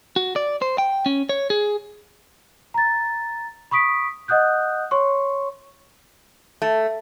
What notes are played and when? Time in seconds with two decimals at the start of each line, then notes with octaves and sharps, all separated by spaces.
0.16 F#4
0.36 D5
0.62 C5
0.78 G5
1.06 C#4
1.29 C#5
1.50 G#4
2.74 A#5 A6
3.71 B5 C#6 D#6 B6 D7
4.28 D#5 F#5 D#6 F#6 G6
4.91 C#5 C6 C#6
6.62 A3